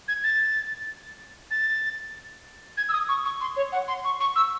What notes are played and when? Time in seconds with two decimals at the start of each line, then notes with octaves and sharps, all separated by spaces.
0.08 G#6
0.24 A6
1.51 A6
2.77 G#6
2.89 E6
2.93 D#6
3.09 C#6
3.25 C#6
3.41 C6
3.56 C#5
3.72 F#5
3.88 C6
4.05 C#6
4.20 C#6
4.36 E6